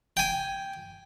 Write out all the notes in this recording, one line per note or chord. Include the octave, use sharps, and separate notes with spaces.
G5 G#5